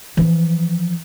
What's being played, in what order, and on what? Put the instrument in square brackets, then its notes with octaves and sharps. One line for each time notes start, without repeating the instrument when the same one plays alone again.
[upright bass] E3 F3